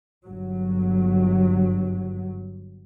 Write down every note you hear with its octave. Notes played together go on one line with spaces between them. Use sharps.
G1 F#3